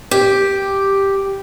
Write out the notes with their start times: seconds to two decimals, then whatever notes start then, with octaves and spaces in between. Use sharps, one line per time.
0.11 G4